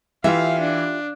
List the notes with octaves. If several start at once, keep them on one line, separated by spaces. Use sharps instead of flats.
E3 F4 G4 E5 F5
D4